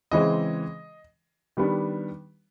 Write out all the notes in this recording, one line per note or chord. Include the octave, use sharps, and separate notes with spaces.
C#3 E3 G#3 C4 D#5
D#3 G3 B3 D4